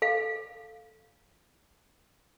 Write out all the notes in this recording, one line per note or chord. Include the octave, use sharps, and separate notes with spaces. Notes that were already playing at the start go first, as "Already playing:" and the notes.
A4 F5